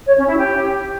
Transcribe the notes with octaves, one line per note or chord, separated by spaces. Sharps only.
C#5
C#4
E4
G4